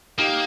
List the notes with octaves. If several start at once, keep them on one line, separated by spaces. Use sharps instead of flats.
A#3 D#4 G4